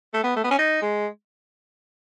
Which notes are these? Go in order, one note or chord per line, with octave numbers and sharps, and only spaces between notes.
A3
B3
A3
B3
C#4
D#4
G#3